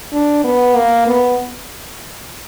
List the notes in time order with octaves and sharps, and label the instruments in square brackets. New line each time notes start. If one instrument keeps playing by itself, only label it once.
[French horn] D4
B3
A#3
B3